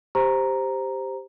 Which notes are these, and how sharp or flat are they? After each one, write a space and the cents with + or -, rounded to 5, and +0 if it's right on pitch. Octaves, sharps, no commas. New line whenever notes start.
G4 +0 C5 +0 A#5 +0